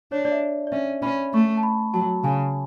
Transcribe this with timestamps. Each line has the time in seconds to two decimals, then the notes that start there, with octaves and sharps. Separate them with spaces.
0.12 D4 C#5
0.25 D5
0.32 E5
0.67 D5
0.72 C#4 E5
1.02 C#4 B5
1.33 A3 C#6
1.57 A5
1.63 B5
1.93 F#3 A5
2.24 C#3 G#5